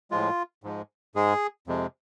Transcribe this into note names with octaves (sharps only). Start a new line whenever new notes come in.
A2 F3 G#3 F4
G#2 F3 G#3
G#2 G#3 G#4
F2 C3 F3 G#3